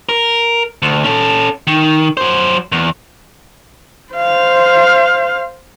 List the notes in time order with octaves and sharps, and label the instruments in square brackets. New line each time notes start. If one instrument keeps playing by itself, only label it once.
[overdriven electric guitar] A#4
D2
C#4 A4
D#3
F#3 C5
E2
[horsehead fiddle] C5 F5